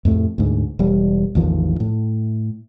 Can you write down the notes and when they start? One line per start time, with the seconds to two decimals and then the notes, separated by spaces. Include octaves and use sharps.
0.05 F2 A2 A3
0.38 D2 G#2
0.79 E1 G3
1.35 A1 E2 D#3 F3
1.80 A2